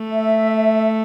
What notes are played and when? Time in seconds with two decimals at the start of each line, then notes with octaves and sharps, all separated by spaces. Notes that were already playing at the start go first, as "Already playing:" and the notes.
Already playing: A3
0.12 E5